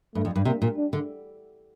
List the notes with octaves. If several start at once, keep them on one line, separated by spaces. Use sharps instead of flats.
G2 A3
F2
G2
C3 A#3
A#2
D4
D3